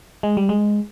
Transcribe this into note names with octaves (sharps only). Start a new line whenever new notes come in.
G#3
G3
G#3